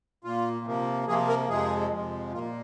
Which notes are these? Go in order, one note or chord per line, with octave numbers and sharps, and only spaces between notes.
A#2 A#3 F4
C3 F3 A#3
C3 F3 A#3 G#4
A#4
F2 C3 F3 G#3 G#4
F2 C3 F3 G#3
A#2 A#3 F4